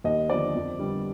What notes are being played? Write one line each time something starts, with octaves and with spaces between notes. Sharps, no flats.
D#2 D#5
D3 F3 B3 D5
F2
D3 G3 B3